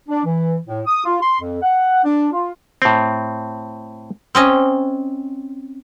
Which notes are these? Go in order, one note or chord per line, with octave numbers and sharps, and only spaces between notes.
D4
E3
A2
D#6
F4
C6
F2
F#5
D4
F4
A2 C4
C4 C#4 D#5